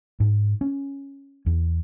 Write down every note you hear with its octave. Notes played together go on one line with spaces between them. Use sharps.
G#2
C#4
E2